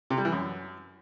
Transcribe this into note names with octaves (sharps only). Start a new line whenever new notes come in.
C3
G3
E3
F#2